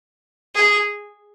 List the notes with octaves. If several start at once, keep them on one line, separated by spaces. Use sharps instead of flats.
G#4